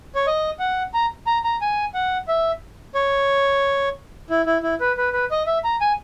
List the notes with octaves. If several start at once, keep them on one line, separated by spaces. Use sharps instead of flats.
C#5
D#5
F#5
A#5
A#5
A#5
G#5
F#5
E5
C#5
E4
E4
E4
B4
B4
B4
D#5
E5
A#5
G#5